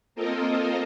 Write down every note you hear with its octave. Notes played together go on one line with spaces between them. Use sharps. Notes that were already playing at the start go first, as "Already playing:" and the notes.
A#3 C4 F4 A4 A#4 D#5